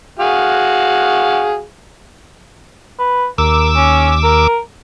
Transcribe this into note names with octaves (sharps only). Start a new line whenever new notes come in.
F#4 G#4 F5
B4
D#2 A#4 D6 E6
C#4
A#4